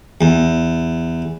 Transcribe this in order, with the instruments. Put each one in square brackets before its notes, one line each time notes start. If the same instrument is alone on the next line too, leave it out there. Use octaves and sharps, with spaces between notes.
[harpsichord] E2